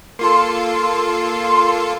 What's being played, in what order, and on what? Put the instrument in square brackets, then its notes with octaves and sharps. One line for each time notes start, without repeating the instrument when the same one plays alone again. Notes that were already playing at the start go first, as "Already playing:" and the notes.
[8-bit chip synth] A#3 F4 A4 [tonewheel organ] C6